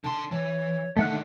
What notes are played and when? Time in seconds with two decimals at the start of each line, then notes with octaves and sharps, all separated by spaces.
0.04 D3 A5 C6
0.31 E3 C#5
0.97 D3 D#3 A3 F#5 F#6